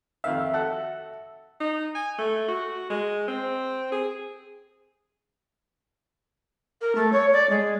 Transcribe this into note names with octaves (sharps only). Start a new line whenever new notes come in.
F2 D#3 E5 F5
F#4 A4 F#5
D#4
G#5
A3
F#4
G#3
C4
G#4
A#4
A3
C#5
D5
G#3